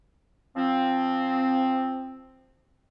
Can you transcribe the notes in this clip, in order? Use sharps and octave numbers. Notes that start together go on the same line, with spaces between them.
F3 C4